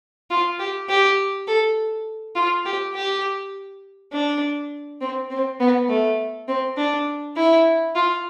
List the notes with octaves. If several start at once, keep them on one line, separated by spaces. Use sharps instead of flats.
F4
G4
G4
A4
F4
G4
G4
D4
C4
C4
B3
A3
C4
D4
E4
F4